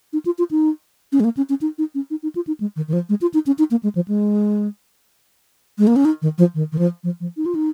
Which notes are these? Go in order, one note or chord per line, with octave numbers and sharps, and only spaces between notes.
D#4
F4
F4
D#4
C#4
G#3
A#3
C#4
C#4
D#4
D#4
C#4
D#4
D#4
F4
D#4
G#3
D#3
D#3
F3
G#3
F4
D#4
C#4
D#4
A#3
G#3
F3
G#3
G#3
A#3
C#4
D#4
D#3
F3
D#3
D#3
F3
F3
F3
D#4
F4
D#4